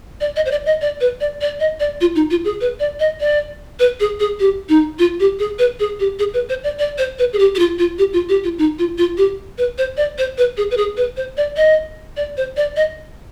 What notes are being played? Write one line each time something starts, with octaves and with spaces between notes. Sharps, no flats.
D5
D#5
C5
D5
D#5
D5
B4
D5
D5
D#5
D5
F4
D#4
F4
G#4
B4
D5
D#5
D5
B4
G#4
G#4
G4
D#4
F4
G4
G#4
B4
G#4
G4
G#4
B4
C5
D5
D5
C5
B4
G#4
G4
G4
F4
F4
G4
F4
G4
F4
D#4
F4
F4
G4
B4
C5
D5
C5
B4
G#4
B4
G#4
B4
C5
D5
D#5
D5
C5
D5
D#5